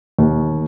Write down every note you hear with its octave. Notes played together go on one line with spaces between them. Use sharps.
D#2